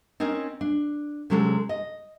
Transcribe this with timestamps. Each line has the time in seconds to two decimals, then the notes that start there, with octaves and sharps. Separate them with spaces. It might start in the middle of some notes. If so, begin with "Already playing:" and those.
0.20 C4 C#4 D#4 A#4 C#5
0.61 D4
1.30 C3 F#3 G#3 C#4 A4
1.69 D#5